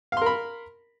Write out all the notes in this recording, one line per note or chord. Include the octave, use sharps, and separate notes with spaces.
A#4 F5 B5 C6